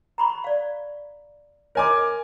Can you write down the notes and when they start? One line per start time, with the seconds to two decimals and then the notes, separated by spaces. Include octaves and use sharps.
0.18 A#5 B5 C#6
0.44 D5 F5
1.75 A#4 C#5 D#5 G#5 C6 D6